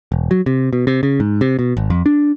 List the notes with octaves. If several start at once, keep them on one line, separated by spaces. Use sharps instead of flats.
E1
F#3
C3
B2
C3
C#3
G#2
C3
B2
G#1
F2
D4